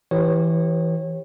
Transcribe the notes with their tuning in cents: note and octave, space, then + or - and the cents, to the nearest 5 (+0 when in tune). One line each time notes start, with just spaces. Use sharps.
E3 +0 G4 +0 C#5 -25